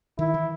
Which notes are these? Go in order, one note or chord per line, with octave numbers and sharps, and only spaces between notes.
D#3 E4
E3